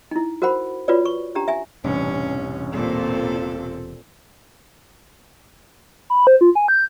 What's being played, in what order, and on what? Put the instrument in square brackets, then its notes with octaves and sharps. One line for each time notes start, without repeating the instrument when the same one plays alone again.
[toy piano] D#4 E4
F#4 A#4 C5 F#5 B5
F4 F#4 B4 C#5 D5
C#6
C#4 D4 G4 A#5
E5 G#5
[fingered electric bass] E1 C3 [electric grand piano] A1 G2 [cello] C#4
[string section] A#2 [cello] C4 A4
[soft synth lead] B5
C5
F4
G#5
G6